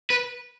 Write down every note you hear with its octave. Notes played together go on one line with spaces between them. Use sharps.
B4